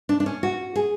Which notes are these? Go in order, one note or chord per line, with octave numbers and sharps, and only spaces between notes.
D4
D4
C#4
F#4
G#4